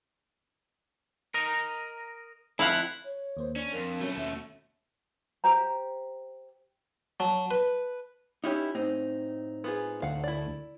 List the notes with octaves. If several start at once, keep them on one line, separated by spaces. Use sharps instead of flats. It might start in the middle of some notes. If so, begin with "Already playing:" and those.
A#4 D#5 A#5
F2 E4 F5 F#5
C#5
D#2 A#3 C5
C#4 D4
F2 A#4
B2 F#3 A3 C#4
D#2 C#4 E5
G4 C5 A#5
F#3 A5
B4
C#4 D#4 E4 F#4 G4
A2 C4 D#4
B3 F4 G#4
D2 F5 F#5
E4 D5